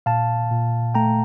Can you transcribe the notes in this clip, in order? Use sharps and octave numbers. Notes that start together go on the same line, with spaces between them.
A#2 F5 A5
A#2
A3 G5 A#5